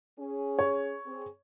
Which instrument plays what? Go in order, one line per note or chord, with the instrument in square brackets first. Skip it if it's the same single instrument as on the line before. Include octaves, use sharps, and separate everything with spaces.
[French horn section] C#4 G#4
[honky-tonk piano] C#5
[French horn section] C4 G#4